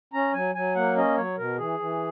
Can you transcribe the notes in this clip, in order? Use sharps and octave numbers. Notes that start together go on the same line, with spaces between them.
C#4 A#5
F#3 G#5
F#3 G#5
A#3 F#5
C#4 D#5
F#3 C#5
B2 A#4
E3 G#4
E3